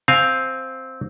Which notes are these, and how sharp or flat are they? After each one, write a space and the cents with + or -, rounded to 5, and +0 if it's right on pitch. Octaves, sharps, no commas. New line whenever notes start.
C4 +0 F5 +0 G#5 +5